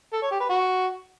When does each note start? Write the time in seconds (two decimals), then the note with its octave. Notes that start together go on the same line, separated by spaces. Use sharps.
0.13 A4
0.22 C#5
0.31 G4
0.40 B4
0.49 F#4